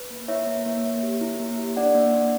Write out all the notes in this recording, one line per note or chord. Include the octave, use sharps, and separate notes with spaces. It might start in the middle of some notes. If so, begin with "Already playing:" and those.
Already playing: B4
A#3
E4 C#5 E5
A#3
A#3
A#3
G4
E4
A#3
G4
D4 D5 F#5
A#3
D4